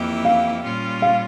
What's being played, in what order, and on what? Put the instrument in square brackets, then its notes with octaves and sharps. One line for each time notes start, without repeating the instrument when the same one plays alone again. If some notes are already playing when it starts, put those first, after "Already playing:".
Already playing: [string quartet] F2 E3 A#3 E4 G4
[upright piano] F5
[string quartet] A#2 G3 C#4 F4
[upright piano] F5